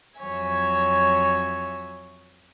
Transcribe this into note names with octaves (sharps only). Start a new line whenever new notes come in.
F2 F#3 C#5 E5 G#5